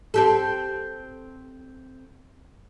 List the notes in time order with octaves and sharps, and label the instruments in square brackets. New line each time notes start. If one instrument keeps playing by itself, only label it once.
[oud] C4 G4 A4